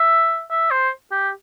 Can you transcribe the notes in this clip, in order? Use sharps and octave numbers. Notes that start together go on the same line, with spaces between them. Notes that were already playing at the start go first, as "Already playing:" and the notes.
Already playing: E5
E5
C5
G4